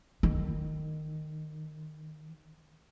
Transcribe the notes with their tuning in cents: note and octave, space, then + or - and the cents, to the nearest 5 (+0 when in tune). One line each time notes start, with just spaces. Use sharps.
D#3 -15